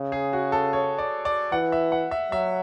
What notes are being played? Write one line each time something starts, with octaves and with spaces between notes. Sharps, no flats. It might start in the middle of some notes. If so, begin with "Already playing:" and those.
Already playing: C#3
G#4
F#4
A4
C#5
D5
D5
E3 F#5
E5
F#5
E5
F#3 E5